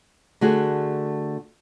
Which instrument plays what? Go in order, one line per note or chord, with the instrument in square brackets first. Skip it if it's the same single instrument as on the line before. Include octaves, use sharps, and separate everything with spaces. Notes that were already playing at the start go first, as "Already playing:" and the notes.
[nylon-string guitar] D3 A3 F#4 G#4